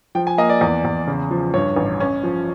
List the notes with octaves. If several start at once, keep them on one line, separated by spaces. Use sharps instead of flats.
F3 G5
G#5
A#3 D#5
D5
E2
E2
C#3
F3
G2 C#5
A1
C#4
F3